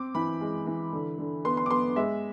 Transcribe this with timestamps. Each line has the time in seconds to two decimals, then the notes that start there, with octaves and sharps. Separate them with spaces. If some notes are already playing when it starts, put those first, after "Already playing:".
Already playing: C4 D6
0.15 E3 B5
0.41 G#3
0.67 E3
0.93 D3
1.18 D3
1.45 B3 C6
1.57 C6
1.66 D6
1.70 B3 C6
1.96 G#3 E5